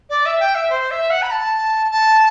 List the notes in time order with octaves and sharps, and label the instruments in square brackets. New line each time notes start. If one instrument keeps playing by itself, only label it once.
[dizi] D5
E5
G5
E5
C5
E5
F#5
B5
A5
A5